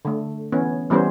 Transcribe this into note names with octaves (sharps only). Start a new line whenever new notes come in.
D3 A3
E3 B3 C#4
E3 G3 B3 C#4 C5